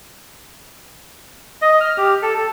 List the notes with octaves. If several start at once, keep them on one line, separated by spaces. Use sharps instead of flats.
D#5
F6
G4
A4
A4